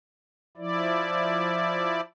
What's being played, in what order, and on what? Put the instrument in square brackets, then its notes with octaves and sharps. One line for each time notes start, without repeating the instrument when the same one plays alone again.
[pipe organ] F3 E4 D5